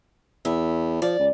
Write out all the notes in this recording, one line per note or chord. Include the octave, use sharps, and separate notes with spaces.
E2 E5
F3 D5
C#2